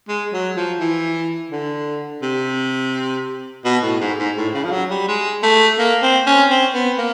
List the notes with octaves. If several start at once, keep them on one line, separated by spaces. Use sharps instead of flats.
G#3
F#3
F3
E3
D3
C3
B2
A2
G#2
G#2
A2
C#3
F3
F#3
G3
G#3
A3
A#3
C4
C#4
C4
B3
A#3